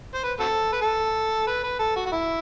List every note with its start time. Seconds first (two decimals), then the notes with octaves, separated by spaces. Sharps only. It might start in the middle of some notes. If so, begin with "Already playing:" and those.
0.15 C5
0.23 B4
0.40 C4 F#4 A4
0.72 B4
0.81 A4
1.47 B4
1.63 B4
1.79 A4
1.96 F#4
2.06 F#4
2.12 E4